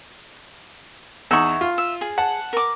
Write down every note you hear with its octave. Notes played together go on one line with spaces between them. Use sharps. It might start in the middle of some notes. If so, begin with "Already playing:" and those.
E2 D#4 E5 F#5 C#6
F4
E5
G#4
F#5 A5
A#4 D6